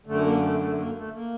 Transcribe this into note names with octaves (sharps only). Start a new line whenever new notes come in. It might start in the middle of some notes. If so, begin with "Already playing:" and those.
F#2 D3 A3
A#3
A3
A3
A#3
A3
A#3